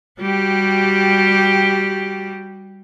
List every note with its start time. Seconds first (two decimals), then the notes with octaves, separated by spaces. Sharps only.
0.21 G3 F#4 G4